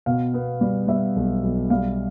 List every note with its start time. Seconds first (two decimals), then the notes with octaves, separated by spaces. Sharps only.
0.06 B2 F5
0.34 B3
0.61 G3
0.88 G3 E5
1.16 B1
1.43 B1
1.70 G3 F5